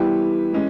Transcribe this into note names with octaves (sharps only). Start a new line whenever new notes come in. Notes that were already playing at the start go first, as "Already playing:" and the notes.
Already playing: E3 G3 B3 E4 G4
E3 G#3 C#4